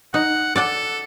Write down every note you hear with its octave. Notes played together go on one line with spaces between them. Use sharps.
D#4 F#5
A4 D5 F#5 A5